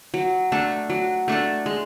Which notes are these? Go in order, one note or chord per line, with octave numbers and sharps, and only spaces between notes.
F#3
A3 D4 A4
F#3
A3 D4 A4
G#3